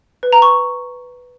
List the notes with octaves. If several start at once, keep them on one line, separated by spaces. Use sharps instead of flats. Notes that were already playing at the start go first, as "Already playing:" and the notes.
B4
A#5
C#6